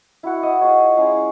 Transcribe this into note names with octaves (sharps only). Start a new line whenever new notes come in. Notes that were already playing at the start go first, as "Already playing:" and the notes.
E4 F#4 F#5
D#5
F4 G#4 C#5
G#3 C#4 E4